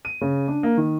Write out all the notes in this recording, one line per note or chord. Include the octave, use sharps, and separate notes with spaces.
D#7
C#3
D4
A#3
D#3